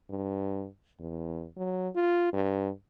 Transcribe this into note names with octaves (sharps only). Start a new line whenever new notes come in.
G2
E2
F#3
F4
G2